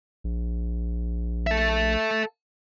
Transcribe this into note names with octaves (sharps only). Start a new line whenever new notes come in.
A#1
A4 E5